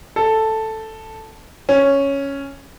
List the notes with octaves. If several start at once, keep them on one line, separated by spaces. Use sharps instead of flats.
A4
C#4